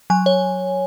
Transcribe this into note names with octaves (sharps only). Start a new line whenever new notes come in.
F#3 G#5
C#5